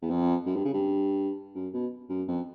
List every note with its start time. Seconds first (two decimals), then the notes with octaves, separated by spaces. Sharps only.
0.02 E2
0.10 F2
0.46 F#2
0.55 G2
0.64 C#3
0.74 G2
1.55 F#2
1.73 B2
2.09 F#2
2.28 F2